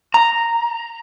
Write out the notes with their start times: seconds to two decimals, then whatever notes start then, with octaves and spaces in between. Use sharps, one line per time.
0.14 A#5